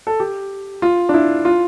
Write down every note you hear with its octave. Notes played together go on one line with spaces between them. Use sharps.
A4
G4
F4
D4
E4
F4